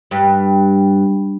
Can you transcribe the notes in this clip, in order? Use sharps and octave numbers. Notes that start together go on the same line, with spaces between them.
G2